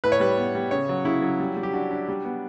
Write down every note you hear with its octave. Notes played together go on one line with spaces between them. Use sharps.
A2 B4
C#5
G3 B4
B3
G3
C#3 C#5
F#3
C#3 E4
F#3
G3
G3
G4
D4 F#4
D4
G3
B3